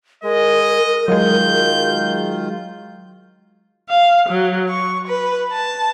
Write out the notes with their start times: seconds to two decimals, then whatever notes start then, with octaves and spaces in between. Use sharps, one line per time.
0.24 G#3 A#4 D#5
1.08 D#3 F#3 G#3 F4 G6
3.88 F5
4.28 F#3
4.69 C#6
5.08 B4
5.52 A5